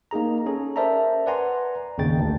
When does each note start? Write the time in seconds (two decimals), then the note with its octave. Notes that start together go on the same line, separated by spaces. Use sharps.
0.11 A#3 D#4 G#4 A#5
0.46 C#4 G#4 A4
0.76 A#4 C5 D5 E5 A5 A#5
1.26 B4 D5 F#5 G#5 A#5 C6
1.98 G#1 D#2 C#3 G5 A6
2.19 D2 D4